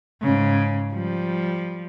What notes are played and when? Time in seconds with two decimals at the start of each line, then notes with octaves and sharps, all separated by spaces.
0.22 G#2 C#3
0.93 F3 G3